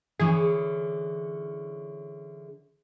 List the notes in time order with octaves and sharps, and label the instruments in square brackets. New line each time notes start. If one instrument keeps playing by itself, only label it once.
[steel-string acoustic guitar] D3 E3 C#4 [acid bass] G#4